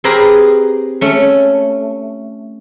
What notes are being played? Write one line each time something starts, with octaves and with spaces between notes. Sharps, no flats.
C4 G4 G#4 A#4 B4
A3 C#4